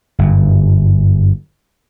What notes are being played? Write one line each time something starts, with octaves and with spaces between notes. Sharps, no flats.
G1 F#2